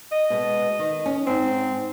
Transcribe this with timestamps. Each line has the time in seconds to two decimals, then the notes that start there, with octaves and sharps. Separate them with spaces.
0.12 D#5
0.30 B2 G#3 B3
0.79 D#3
1.06 C#4
1.27 G#2 C4